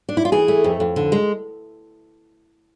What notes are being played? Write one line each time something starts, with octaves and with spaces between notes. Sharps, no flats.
D4
E4
F4
E3 G#4
A3
F2
F2
D3
G#3